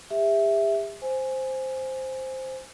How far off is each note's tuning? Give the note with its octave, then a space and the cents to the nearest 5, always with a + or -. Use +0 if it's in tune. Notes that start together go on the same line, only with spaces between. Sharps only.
G4 +45 E5 +0
C5 +0 G#5 +0